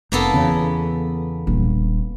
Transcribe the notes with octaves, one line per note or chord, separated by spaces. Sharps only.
F1 A#3 B3 A4
E2 C#3
D#1 D4